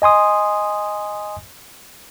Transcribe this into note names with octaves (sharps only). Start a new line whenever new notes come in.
D#5 G#5 C6 D#6